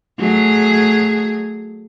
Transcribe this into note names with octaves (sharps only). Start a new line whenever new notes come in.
F#3 A3 G#4